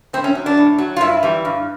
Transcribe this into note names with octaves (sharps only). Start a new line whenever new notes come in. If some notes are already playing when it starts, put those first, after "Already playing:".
A2 C4
C#4
F#3
D4
A2
F#3
F4
G2 E4
E3 G3
G2